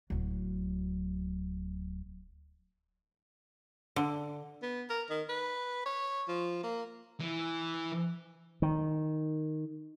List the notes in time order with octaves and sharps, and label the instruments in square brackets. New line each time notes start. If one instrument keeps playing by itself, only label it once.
[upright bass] D1 F#3
[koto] D3
[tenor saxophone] B3
A#4
D#3
B4
C#5
F3
A#3
[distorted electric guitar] E3
[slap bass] D#3